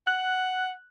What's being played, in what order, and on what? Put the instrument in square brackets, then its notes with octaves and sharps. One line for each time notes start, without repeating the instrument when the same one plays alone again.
[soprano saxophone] F#5 [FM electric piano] F#6